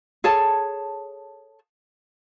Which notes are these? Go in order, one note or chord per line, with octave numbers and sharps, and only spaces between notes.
G#4 A4 C#5 A5